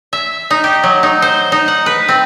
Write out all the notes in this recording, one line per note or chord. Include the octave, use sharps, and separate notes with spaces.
E5
D#4
G4
F#3
D#4
C5
D#4
F#5
B4
C4